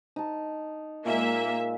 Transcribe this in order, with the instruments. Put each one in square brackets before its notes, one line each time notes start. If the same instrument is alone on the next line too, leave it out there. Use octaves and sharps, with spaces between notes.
[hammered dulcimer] D#4 A5
[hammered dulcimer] A#2 G#3 [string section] A#3 E5